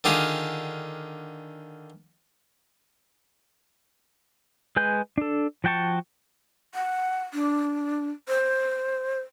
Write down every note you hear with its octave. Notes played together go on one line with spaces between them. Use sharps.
D3 D#3 F4 G4 G#4
G#3 B4 G#5 G6
D4 A4
F3 F#4 G5 A5 C#6
F#5
D4
C5